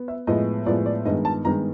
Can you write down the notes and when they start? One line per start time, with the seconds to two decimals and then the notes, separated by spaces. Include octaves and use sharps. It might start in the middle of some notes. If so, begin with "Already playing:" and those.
Already playing: B3
0.08 E5
0.27 A2 F3 G#3 B3 D#5
0.66 A2 F3 G#3 B3 D5
0.86 D5
1.05 G2 D#3 G#3 B3 D#5
1.25 A5
1.44 G2 D#3 G#3 B3 A#5